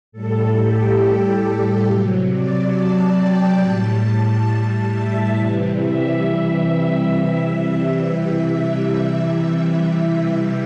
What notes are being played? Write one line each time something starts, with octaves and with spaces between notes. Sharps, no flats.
A2 G3 A4
G4
C3 F#3
D5
A5
G5
A2 G3 A5
E5
C3 E3 G3
E5